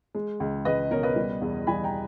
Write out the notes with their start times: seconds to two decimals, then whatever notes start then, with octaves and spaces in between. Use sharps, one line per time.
0.15 G#3
0.40 C#2
0.65 C#2 B4 D#5
0.91 B2 A#4 C#5
1.03 B4 D#5
1.16 G3
1.41 E2
1.67 G3 G#5 B5
1.84 G5 A#5